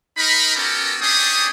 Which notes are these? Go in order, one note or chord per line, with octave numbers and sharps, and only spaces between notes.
D#4 A#4 B5
B3 C#4 F#4 G4 A4 A#4
A3 C#4 D4 G4 G#4 D#6